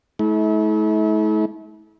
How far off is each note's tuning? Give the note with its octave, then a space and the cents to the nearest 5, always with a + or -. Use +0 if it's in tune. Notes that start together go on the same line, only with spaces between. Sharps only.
A3 -35 E4 -40